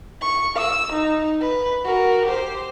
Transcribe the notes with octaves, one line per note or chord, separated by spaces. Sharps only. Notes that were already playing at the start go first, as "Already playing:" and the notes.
C#6
E6
D#4
B4
F#4 A#4
G4 C5